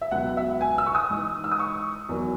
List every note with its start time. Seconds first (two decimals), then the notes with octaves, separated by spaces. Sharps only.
0.01 E5
0.11 C#2 B2 F#3 F#5
0.37 E5
0.61 G#5
0.78 E6
0.86 C#6
0.95 D#6
1.10 G#2 E3
1.44 E6
1.52 D#6
1.59 C#6
2.09 E2 D#3 F#3